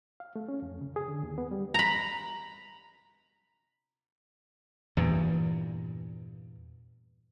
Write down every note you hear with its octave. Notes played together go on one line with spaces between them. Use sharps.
F5
A3
C#4
F2
C#3
G#4
D3
D#2
B3
G3
A#5 B5
E2 G2 A#2